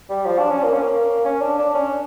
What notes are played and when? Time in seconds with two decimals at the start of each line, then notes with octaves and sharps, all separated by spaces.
0.10 G3
0.26 F3
0.39 D4
0.51 C#4
0.63 A#3
0.73 C#4
0.82 A#3
1.25 C#4
1.42 D4
1.58 D4
1.75 C#4